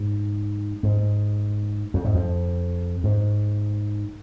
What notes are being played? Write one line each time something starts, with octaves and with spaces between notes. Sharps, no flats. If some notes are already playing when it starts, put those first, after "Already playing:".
Already playing: G#2
G#2
F2
G#2
F2
G#2